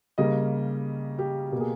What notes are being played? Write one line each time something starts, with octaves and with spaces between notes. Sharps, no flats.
C#3 G3 A#3 D#5
G4
B2 A#3 G4 G#4